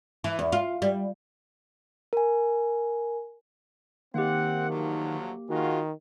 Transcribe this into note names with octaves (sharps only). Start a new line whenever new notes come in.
E3
E2
F4
G3
A#4 G#5
D#3 A#3 C4 G4 F#5
D2 F3 F#3
D#3 G#3 F4 F#4